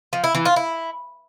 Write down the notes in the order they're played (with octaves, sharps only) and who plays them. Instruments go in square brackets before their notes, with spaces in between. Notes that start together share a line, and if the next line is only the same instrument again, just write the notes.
[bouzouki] F3
E4
E3
F4
E4